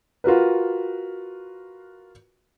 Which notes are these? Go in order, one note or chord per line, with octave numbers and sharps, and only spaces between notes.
F4 F#4 A#4 B4